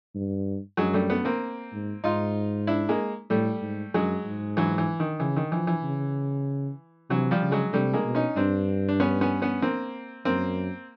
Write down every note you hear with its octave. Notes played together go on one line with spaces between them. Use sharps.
G2
F#2 F#3 G#3
G3 A3
A3 B3
A#3 C4
G#2
G#2 D#4 F4
D4 E4
G#3 A#3
A2 G3 A3
G#2
F#2 F#3 G#3
G#2
E3 F#3
E3
D#3
C#3 E3
D#3
E3 F3
E3
C#3
C3 E3 F#3
F3 G3
C#3
F#3 G#3
C3 G3 A3
G#3 A#3
B2
C#4 D#4
G2 C4 D4
D4
B3 C#4
B3 C#4
B3 C#4
A#3 C4
F#2 A#3 C4